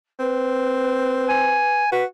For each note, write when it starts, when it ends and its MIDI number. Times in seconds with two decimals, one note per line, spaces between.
0.19 1.61 60
0.19 1.83 71
1.29 1.90 80
1.92 2.06 66
1.92 2.04 71